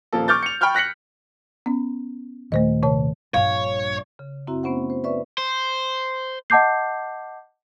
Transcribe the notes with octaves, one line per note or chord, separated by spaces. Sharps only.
D#1 F3 A#3 A4
C#6 D6 F6 G6 A6
C#7 F7
G5 B5 C#6 F6 G6
F#6 A#6 B6 C#7 F#7
B3 C#4
D#2 A#2 D#3 A3 C5 D#5
C3 C#5 A5
A#1 G2 C#5 F5
C#3
F#2 C4 E4 F#4 E5 A#5
A3 B3 C#4 C5 F#5
C5
B4 D5 E5 C#6
C5
D#5 F#5 A5 D6 G6 C7